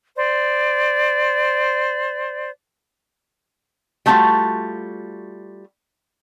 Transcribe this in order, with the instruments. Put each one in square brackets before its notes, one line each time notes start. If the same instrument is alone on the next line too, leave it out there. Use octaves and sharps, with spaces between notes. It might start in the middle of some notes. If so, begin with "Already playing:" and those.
[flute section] C5 D5
[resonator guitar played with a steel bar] G3 A3 C4 D#4 F4 F#4